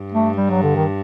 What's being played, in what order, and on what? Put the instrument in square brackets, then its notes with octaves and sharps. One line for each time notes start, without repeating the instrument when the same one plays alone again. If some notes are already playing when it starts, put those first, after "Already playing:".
Already playing: [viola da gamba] G2
[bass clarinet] A3
G3
F#3
D3
D#3